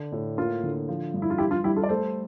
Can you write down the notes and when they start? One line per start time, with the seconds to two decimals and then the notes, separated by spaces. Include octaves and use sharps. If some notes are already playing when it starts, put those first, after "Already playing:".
Already playing: D3 D4
0.12 A2
0.37 A#3 F4
0.63 D3
0.88 F3
1.14 G2
1.22 E4
1.30 F4
1.38 E3 E4 G4
1.51 F4
1.64 G3 E4 G4
1.76 F4 A4
1.84 D5
1.89 A3 A4 C5